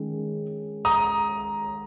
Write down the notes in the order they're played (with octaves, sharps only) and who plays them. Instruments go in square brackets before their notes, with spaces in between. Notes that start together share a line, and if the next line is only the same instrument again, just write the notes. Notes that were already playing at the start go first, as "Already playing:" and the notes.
Already playing: [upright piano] D#3 G#3 C#4
[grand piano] A#5 D#6